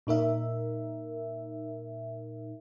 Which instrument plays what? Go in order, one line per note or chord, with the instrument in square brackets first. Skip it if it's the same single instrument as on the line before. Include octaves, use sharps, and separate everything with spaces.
[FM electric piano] A#2 D#4 A#4 E5